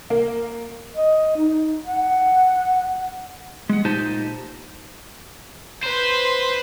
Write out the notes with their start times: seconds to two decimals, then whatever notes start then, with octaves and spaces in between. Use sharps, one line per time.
0.10 A#3
0.96 D#5
1.36 D#4
1.86 F#5
3.69 G#3 F#5
3.85 A#2 D#4 G4 C5 A5
5.84 B4 C5 C6